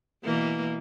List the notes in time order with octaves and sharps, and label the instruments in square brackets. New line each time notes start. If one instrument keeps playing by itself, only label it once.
[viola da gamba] B2 E3 A#3